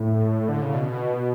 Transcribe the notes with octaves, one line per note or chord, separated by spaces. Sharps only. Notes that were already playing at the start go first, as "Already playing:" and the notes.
Already playing: A2
D3
C#3
B2